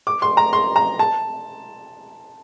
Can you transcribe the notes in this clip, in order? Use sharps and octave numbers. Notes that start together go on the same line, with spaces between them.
D6
C6
A#5
C6
A#5
A5